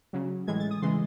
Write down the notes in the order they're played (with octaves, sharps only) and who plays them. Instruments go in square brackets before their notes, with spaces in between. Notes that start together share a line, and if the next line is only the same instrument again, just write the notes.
[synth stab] C#3 F#3
A2 E3 G#3 G#6
A6
D#6
C#3 E3 G#3 C6